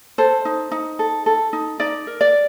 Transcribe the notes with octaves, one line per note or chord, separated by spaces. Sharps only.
A4 C5
D#4
D#4
A4
A4
D#4
D#4 D5
A#4
D5